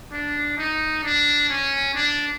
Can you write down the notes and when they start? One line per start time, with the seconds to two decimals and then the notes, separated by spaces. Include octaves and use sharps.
0.13 D4
0.58 D#4
1.03 D4
1.50 C#4
1.95 D4